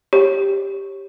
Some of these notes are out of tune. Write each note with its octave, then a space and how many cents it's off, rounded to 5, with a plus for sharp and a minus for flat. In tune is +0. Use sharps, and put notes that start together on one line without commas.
G4 +0 C#5 -20